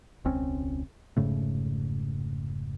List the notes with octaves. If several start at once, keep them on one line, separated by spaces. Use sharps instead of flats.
E1 C#2 C4 C#4
F1 G#2 C#3 A3